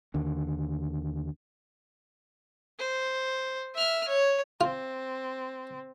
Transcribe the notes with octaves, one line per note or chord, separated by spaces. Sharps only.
D#2 D3
C5
E5 F6
C#5
C4 F4